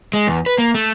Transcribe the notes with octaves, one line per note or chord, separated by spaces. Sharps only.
G#3
E2
B4
A#3
A3